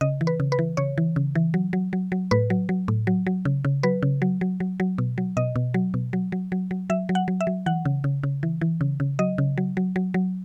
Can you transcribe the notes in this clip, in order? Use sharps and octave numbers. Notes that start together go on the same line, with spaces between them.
C#3 D#5
E3
B4
C#3
B4
E3
C#3 C#5
E3
C#3
E3
F#3
F#3
F#3
F#3
A2 B4
F#3
F#3
A2
F#3
F#3
C#3
C#3
F#3 B4
C#3
F#3
F#3
F#3
F#3
B2
F#3
B2 D#5
B2
F#3
B2
F#3
F#3
F#3
F#3
F#3 E5
F#3
F#5
F#3
E5
F#3
E3 F#5
C#3
C#3
C#3
E3
E3
C#3
C#3
F#3 D#5
C#3
F#3
F#3
F#3
F#3